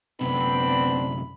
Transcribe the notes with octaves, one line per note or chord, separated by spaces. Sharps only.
F#2 C3 B3 C4 D4 B5